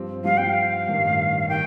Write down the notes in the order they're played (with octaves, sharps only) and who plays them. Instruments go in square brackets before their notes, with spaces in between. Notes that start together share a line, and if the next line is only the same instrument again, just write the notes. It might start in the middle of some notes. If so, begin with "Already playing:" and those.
Already playing: [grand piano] G2 F3 C4 G4
[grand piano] G2 F3 C4 G4 [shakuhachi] F5
[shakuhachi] G5
F5
[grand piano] A1 G2 D#3
[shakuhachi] F5
[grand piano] D#3 [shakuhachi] G5